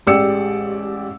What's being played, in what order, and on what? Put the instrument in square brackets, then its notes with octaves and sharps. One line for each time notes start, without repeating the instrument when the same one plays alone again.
[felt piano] A1 G#3 G4 D5 E6 C#7